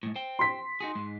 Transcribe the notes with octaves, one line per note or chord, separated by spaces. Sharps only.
A2 G#3
C5 G5
C6 B6
D#4 F#4 G#4
G#2 G#3